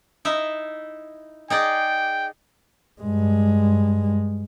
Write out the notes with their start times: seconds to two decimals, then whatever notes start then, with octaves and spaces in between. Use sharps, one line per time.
0.25 D#4 E4 E5
1.50 D#4 G#4 D5 G5
3.01 G2 G#3